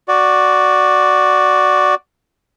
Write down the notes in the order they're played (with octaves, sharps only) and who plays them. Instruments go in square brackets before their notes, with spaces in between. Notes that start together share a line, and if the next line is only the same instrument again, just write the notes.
[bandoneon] F#4 D5